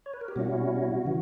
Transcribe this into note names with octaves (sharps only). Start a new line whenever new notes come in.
C#5
B4
A#4
G4
B2 G3 C#4 E4 F#4
C#3 E3